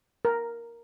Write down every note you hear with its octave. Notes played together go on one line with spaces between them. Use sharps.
A#4